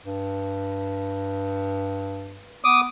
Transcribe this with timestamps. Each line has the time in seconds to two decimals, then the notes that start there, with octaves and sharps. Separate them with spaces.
0.05 G2
2.64 B3 D6 D#6